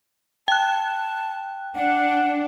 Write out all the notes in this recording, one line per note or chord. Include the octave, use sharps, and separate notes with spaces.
G5 A5 F#6
D4 F#5